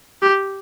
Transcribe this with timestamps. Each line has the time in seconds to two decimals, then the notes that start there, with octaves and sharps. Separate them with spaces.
0.22 G4